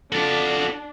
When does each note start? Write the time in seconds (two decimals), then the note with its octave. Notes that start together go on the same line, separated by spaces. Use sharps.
0.12 D4 F4 F#4 A4 A5